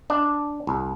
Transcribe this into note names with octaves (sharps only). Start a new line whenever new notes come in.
D4
C2